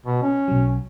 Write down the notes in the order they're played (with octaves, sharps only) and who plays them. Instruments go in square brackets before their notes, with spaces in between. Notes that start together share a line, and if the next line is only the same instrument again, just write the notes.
[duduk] B2
C#4
[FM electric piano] B1 F#3